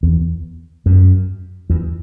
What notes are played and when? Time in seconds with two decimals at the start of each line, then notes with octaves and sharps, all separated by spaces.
0.03 E2
0.86 F#2
1.70 E2